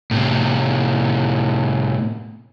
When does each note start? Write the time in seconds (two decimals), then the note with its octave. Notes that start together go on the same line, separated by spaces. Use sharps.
0.11 A2 C3